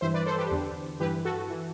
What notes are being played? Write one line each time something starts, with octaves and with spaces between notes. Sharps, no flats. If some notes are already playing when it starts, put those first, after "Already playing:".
G2 E3 C5 E5
B4 D5
A4 C5
G4 B4
E2 D3
G2 E3 G4 B4
F#4 A4
E3